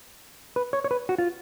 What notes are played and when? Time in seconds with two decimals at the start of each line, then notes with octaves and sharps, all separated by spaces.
0.56 B4
0.73 C#5
0.84 C#5
0.91 B4
1.09 F#4
1.18 F4